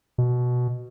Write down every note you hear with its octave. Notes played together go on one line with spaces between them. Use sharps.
B2